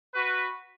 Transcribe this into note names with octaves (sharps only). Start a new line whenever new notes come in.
F#4 B4